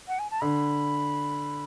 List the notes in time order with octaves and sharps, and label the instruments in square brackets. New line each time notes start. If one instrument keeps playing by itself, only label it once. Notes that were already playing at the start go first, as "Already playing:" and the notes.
[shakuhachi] F#5
G#5
A5
[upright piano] D3 [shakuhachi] B5